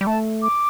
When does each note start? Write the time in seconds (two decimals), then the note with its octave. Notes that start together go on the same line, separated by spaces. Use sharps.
0.01 G3
0.07 A3 A5
0.42 D6